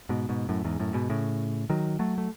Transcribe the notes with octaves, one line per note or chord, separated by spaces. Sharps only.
G#2 B2
G#2 B2
F#2 A2
E2 G#2
F#2 A2
G#2 B2
A2 C#3
D#3 F#3
F#3 A3
A3